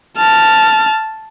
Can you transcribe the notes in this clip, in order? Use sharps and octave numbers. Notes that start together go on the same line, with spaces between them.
A5 F6